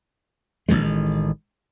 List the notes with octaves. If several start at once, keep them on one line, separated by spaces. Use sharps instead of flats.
A1 C3 D#3 G#3